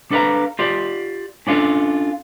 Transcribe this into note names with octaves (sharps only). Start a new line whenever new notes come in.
D4 A4 B4 D#5 F5 A#5
F4 G4 D5
C#4 D4 F4 A4